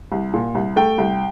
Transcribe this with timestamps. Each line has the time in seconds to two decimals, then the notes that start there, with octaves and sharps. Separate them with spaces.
0.12 C2
0.33 A#2
0.55 C2
0.76 A3 G5
0.98 C2